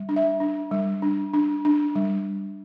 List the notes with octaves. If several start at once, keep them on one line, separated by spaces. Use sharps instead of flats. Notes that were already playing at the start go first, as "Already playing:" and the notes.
Already playing: G3
D4
E5
D4
G3
D4
D4
D4
G3